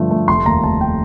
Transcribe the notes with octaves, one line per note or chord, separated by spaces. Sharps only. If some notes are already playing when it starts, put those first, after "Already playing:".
Already playing: G2 D3 F3 A3
A3
F1 C6
D#2 A#5
F1 A5
G5